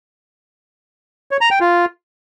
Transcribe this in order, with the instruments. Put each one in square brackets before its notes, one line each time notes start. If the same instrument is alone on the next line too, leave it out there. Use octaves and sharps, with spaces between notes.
[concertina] C#5
A#5
G5
F4